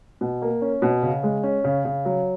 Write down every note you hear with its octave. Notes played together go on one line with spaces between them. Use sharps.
B2
A#3
C#4
B2
C#3
G#3
C#4
C#3
C#3
F#3